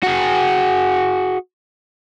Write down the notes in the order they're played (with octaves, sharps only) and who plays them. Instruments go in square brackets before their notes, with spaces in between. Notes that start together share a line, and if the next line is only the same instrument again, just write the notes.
[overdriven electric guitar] F#4 G#4